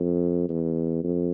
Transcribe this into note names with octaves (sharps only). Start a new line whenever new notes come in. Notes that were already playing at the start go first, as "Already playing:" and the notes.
Already playing: F2
E2
F2